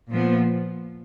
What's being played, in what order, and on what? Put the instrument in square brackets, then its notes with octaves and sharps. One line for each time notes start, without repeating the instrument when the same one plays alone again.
[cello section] A#2 F3 B3